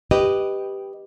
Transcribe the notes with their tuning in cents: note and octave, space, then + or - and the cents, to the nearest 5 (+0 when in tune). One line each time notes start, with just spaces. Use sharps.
G4 +0 B4 +0 D#5 +0